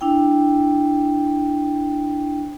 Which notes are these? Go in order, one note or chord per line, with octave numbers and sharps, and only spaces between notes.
D4 E4 G5